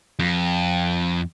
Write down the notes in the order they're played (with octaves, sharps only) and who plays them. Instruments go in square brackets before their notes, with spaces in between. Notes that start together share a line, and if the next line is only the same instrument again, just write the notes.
[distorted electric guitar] F2